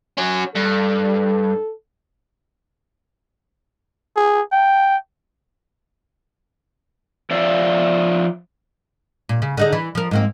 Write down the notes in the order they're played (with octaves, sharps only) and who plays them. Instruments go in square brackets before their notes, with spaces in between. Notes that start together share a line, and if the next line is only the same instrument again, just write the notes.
[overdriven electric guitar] C#4 F#4
[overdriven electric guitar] G2 [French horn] A4
[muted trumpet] G#4
G5
[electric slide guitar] F3 D5 E5 F5
[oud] A#2
C#3
D3 D#4 G#4
E3
F3 A#4
G#2 A#3 C4